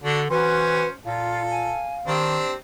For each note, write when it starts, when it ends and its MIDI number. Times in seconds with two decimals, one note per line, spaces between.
0.03 0.29 50
0.03 0.21 62
0.03 0.21 66
0.30 0.84 52
0.30 0.92 61
0.30 0.86 66
0.30 0.88 71
0.30 0.92 72
1.05 1.74 46
1.05 1.43 65
1.05 1.82 69
1.05 2.12 77
1.50 1.96 80
2.07 2.40 51
2.07 2.53 60
2.07 2.53 62
2.07 2.55 67